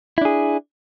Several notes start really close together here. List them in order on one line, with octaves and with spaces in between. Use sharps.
E4 D4 G#4